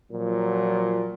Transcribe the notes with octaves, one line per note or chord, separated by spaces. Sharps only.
A#2 F3 F#3